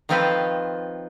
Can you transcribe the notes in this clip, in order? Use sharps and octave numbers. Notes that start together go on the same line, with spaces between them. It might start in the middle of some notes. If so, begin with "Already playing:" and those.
D#3 F3 C4 F4 A4 B4